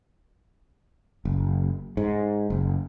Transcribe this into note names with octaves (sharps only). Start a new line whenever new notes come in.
F#1
G#2
F#1